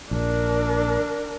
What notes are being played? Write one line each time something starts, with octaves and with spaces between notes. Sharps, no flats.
A#1 D4 A#4